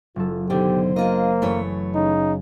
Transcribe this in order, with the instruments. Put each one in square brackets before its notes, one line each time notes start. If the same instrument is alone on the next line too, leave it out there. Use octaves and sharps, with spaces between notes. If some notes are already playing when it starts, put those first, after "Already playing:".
[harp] F#1 F#3 A4 [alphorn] F4
[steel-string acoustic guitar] B2 D3 D#3 [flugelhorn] G4 [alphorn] C5
[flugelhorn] A#3 [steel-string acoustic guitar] D4 F4 D#5
[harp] F#2 [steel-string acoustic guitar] E3 A3 C#5
[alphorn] C#3 [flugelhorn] D#4